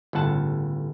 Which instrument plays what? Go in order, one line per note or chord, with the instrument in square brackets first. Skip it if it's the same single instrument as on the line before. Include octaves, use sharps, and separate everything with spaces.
[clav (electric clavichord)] G1 A2 C#3 F#5 A5